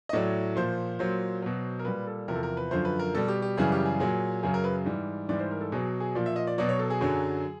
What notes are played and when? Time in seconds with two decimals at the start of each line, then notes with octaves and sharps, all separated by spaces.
0.09 D#5
0.13 A2 F#3 D5
0.56 A#2 F3 C5
0.99 A#2 F#3 C5
1.42 B2 F#3
1.79 A#4
1.85 A#2 G3 B4
2.07 A4
2.28 E2 C3 F3 A#4
2.35 A4
2.43 A#4
2.57 B4
2.71 F#2 D3 F3 C5
2.85 B4
2.99 A#4
3.14 B2 G3 A4
3.28 G4
3.42 G4
3.57 F#2 C#3 E3 G3 G#4
3.72 G4
3.86 G#4
4.00 A#2 F#3 G#4
4.43 F#2 C#3 F#3 G#4
4.54 A#4
4.64 B4
4.86 G#2 E3 G3
5.29 G#2 E3 G3 D5
5.39 C5
5.51 A#4
5.61 A4
5.72 B2 F#3 G#4
6.00 G#4
6.15 A#2 F3 D5
6.26 E5
6.36 D#5
6.47 D5
6.58 B2 F#3 D5
6.69 C#5
6.79 A4
6.90 G#4
7.01 F#2 D3 F#3